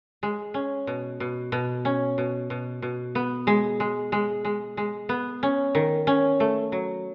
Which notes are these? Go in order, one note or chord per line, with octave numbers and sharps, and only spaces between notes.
G#3
C#4
B2
B2
B2
C#4
B2
B2
B2
B3
G#3
G#3
G#3
G#3
G#3
B3
C#4
D#3
C#4
A3
F#3